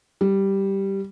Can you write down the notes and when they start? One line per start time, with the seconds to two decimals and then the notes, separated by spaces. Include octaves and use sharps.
0.21 G3